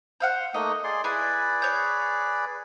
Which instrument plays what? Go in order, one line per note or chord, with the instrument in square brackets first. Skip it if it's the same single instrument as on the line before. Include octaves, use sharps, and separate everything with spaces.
[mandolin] C5 F5 F#5
[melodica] A3 A#3 D#4 [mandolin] D#5
[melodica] G#4 D5 C6
[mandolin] E4 G#5 [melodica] G#4 B4 D5
[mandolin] C#5 G6